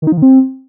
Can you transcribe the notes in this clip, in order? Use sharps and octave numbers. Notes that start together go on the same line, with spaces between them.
D#3
D#4
F3
D#3
C4